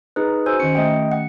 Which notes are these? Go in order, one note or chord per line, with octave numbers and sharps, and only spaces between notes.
D#4 G#4 B4
F#4 C5 G#5 E6
D#3 C#4 C#7
A3 D#5 G5
F#5